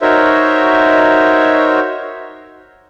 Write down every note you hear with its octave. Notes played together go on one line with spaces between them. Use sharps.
D#4 F#4 A#4 C5 C#5 E5